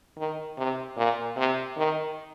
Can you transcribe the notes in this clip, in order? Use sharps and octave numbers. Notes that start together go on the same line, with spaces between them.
D#3
C3
A#2
C3
D#3